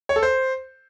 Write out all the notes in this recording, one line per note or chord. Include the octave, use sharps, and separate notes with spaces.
C#5
A4
C5